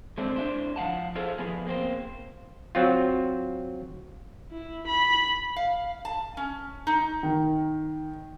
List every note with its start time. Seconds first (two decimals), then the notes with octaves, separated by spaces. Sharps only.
0.18 G#3 A3 C4 D4
0.36 D4 E4 C5
0.76 F3 F5 F#5 A5
1.15 E4 G#4 A4 C5 F5
1.38 F3 B3 G#4
1.67 A#3 C4 F#4 C5
2.75 F#3 C4 F4
4.51 E4
4.87 B5
5.56 F5
6.05 A5
6.37 C#4
6.87 D#4
7.23 D#3